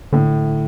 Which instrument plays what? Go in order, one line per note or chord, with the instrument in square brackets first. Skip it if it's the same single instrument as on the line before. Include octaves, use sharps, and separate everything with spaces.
[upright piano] A2 [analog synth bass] D3